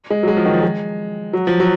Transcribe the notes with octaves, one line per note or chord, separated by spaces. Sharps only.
G#3
F#3
G#3
F3
D#3
F3
G#3
F#3
F3
F#3